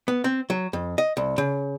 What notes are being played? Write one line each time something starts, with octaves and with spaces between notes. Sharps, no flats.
B3
C4
F#3
F2
D#5
C2
C#3